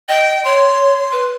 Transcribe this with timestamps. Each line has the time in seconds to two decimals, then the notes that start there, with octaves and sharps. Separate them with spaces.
0.09 D#5 G5
0.45 C#5 C6
1.12 B4